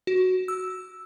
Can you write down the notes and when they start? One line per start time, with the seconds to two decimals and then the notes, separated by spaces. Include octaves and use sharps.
0.07 F#4
0.48 E6